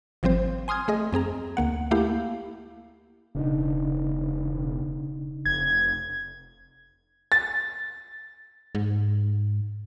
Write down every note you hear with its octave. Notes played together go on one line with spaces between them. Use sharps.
G#1 F3 G3 C4 C5
G#5 C6 D#6 F6 G#6
A3 G#4 D#5
F#2 C4 G#4 A#5
D2 A#3 F#5
A3 A#3 E4 G4 F5
E1 C#3 D4 D#4
F1 G#6
A6
G#2